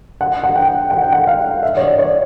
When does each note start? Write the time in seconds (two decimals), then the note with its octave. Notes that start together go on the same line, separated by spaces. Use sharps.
0.21 F#5
0.44 F#5
0.56 G5
0.91 F#5
1.02 G5
1.13 F#5
1.27 F5
1.63 E5
1.77 C#5
1.81 D5
1.99 C#5